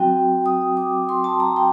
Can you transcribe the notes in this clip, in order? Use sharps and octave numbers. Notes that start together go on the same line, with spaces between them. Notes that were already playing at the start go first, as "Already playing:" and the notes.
Already playing: F#3 C4 F#4 G5
D#6
D6
C6
A5
A#5
G5